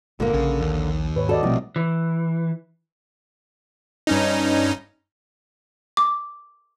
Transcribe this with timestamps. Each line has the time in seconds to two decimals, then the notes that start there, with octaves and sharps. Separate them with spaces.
0.20 G1 A#2 D3 A#3
0.33 A#1 C#3
0.61 D#2
1.16 G#2 B4 C#5
1.29 F#4 A4 D5 D#5
1.43 A#1 B2 F3 G3 A3 C4 E4
1.76 E3
4.07 G2 C#4 D#4
5.97 D6